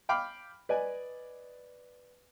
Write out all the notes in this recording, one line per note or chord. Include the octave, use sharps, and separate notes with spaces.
F5 G5 B5 D6 F6
B4 D5 D#5 G#5